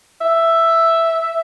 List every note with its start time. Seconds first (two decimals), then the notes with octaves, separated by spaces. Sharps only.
0.21 E5